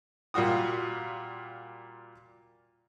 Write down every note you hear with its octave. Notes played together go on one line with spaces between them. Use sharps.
A#2 G3 F4 F#4 D#6